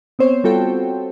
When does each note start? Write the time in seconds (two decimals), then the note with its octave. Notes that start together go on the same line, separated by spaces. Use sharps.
0.19 B3 C4 C5 C#5
0.44 G3 F4 F#4 A4 G5